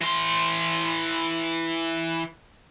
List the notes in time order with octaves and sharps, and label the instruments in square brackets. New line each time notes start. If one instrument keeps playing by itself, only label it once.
[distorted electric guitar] E3 C6